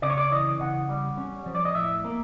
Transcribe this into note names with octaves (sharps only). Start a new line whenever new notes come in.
C#3 D5
C#5
D5
E3 D#5
C#3 F#5
G3
C#4
F3
D5
D#5
A2 E5
A#3